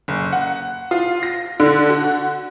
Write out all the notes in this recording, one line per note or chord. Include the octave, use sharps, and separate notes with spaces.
F#1
F#5
F4
A#6
D3
F#4